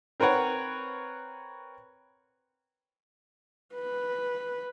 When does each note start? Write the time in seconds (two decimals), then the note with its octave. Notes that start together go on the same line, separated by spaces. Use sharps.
0.20 C4 A#4 B4 C#5 F#5
3.74 B4